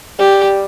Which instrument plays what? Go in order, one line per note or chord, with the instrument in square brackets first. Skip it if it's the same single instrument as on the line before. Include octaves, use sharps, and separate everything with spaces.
[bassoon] G3 [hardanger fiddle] G4